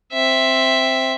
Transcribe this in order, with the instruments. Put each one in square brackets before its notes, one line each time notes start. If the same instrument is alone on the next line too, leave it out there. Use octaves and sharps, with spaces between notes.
[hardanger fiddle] C4 E5